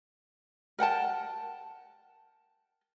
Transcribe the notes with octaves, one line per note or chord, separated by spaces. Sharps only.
A#4 F#5 G5 A5